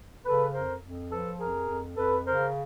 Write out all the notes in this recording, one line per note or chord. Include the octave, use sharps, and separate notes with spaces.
C#3 A4 B4
F2 A#4 C5
F2
F3 A4 B4
F2 G#4 A#4
F2
F2 A4 B4
C#3 A#4 C5